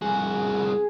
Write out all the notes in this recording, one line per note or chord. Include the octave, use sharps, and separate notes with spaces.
C2 F#4 G#4